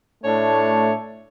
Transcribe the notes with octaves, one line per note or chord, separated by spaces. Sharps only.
A2 A3 D4 C#5 A5